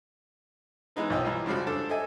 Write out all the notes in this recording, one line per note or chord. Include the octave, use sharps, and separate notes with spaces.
E3 G#3 B3 D#4 B4
B1 F3 C#5 D#5 G5 E6
E3 G3 A#3 F4
C#3 F3 G3 G#3 F#4
D4 A4 C5 A5
A4 D#5 E5 G#5